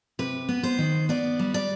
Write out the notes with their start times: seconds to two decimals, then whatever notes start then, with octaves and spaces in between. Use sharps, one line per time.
0.19 C3 B4
0.49 B3
0.63 C5
0.78 D#3
1.09 B3 D5
1.39 G3
1.54 D5